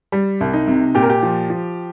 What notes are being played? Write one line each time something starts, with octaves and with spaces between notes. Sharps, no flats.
G3
C2
D#4
C3
A#2 G4
A#4
G4
F3
F3